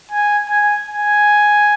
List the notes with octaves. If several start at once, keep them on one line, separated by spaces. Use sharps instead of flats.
G#5
G#5
G#5